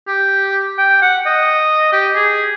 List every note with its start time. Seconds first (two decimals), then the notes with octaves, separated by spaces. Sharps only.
0.07 G4
0.78 G5
1.02 F#5
1.26 D#5
1.92 G4
2.16 G#4